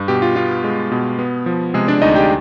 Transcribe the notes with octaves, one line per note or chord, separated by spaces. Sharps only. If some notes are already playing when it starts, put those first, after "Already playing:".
Already playing: G2
B2 G4
F4
B3 F4
G#3
B2
B3
F3
C3 G#3 G#4
D4 D5
D2 D#4 D#5
G4 G5